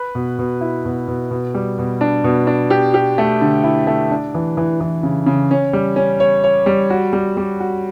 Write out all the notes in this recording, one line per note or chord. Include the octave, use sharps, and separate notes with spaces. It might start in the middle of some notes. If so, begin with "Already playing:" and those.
Already playing: B4
B2
B2
E4
B2
B2
B2
G3
B2
D4
B2
D4
G4
G4
A3
D3
E4
A3
D4
E3
E3
E3
C#3
C#3
C#4
G3
C#4
C#5
C#5
G3
F#4
G3
G3
F#4